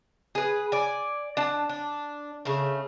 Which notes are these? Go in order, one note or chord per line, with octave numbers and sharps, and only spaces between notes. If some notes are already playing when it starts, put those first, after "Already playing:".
G#4 B4
D5 G#5
D4 A5
D4
C#3 A3